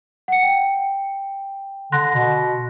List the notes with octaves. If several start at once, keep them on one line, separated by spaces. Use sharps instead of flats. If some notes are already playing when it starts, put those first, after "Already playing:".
F#5 C#7
G5
D3 C6 F#6 A#6
B2